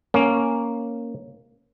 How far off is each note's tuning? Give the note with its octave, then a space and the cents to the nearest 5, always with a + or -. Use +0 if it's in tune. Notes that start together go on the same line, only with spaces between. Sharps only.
A#3 +0 C#4 +0